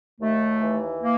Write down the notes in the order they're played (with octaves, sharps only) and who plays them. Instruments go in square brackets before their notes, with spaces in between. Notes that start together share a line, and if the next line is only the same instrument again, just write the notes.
[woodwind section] D#2 A3
E3
A#3